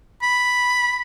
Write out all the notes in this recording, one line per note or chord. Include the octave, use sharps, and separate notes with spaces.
B5